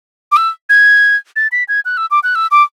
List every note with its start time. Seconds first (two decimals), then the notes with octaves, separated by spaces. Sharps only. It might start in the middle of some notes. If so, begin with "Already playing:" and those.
0.32 D6
0.37 E6
0.69 G#6
1.36 A6
1.52 B6
1.68 G#6
1.85 F#6
1.97 E6
2.11 D6
2.23 F#6
2.35 E6
2.51 D6